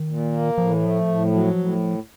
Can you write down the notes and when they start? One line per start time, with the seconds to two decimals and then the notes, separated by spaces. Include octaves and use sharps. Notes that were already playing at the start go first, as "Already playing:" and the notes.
Already playing: D#3
0.08 A#2
0.32 A#3
0.58 A2 F3
0.71 E3
0.82 F3 A3
1.08 A2
1.33 F#3
1.58 A2